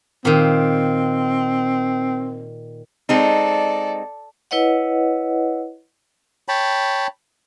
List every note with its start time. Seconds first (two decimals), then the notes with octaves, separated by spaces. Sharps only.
0.25 A#2 D#3 C4
3.09 G#3 C4 D#4 A4 D5
4.51 E4 B4 C#5 D#5 F#5
6.48 C#5 G5 A5 B5